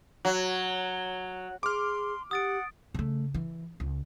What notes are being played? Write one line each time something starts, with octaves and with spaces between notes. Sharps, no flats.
F#3
G#4 C6 D6 F6
G4 F#5 D#6 A6 D7
C#3 A3
E3
C#2